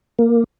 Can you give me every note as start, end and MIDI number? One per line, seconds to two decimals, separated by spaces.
0.19 0.44 58